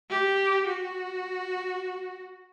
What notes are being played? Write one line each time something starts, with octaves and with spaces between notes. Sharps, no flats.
G4
F#4